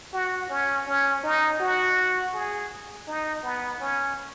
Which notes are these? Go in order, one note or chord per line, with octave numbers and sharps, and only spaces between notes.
F#4
C#4
C#4
D#4
F#4
G#4
D#4
B3
C#4